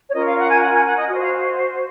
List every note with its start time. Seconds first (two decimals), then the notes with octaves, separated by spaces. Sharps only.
0.09 C#5
0.14 C#4 F4 A#4 D#5
0.26 F5
0.38 F#5
0.50 G#5
0.62 F#5
0.73 G#5
0.86 F#5
0.97 D#5
1.09 F#4 D#5
1.13 C5
1.21 F5